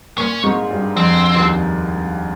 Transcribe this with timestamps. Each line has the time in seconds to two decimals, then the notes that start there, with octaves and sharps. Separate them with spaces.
0.18 A#2 A#3 C#4
0.44 G#2 G#3
0.71 G2 G3
0.96 F2 F3 C4
1.36 D#2 D#3